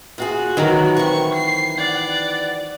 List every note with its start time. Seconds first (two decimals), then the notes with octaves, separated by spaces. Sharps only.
0.18 D#2 F4 F#4 G#4
0.57 D#3 E3 F#3 A#4
0.97 E3 C4 C#6
1.34 C7
1.78 D5 F#5